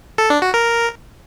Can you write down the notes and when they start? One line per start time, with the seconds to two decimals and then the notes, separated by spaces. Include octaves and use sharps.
0.18 A4
0.30 D4
0.42 F#4
0.54 A#4